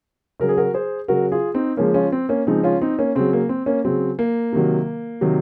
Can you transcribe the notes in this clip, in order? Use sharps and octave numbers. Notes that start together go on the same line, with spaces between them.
C#3 F#3 A#4
G#4
F#4 A#4
G#4 C5
C#3 F#3 F#4 A#4
F4 G#4
C4 D#4
C#3 F3 G#3 A#3 C#4
C#4 F4
C4
A#3 C#4
C#3 F3 G#3 C4 D#4
C#4 F4
C4 D#4
A#3 C#4
C#3 F#3 C4
A#3
C4
A#3 C#4
C#3 F#3 C4
A#3
C3 D#3 F#3
C3 D#3 F#3